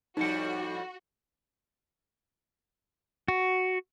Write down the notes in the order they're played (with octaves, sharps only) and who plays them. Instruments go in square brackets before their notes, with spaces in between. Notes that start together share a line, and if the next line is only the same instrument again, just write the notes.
[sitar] F2 A2 G3 [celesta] D#4 C#7 [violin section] F#4
[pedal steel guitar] F#4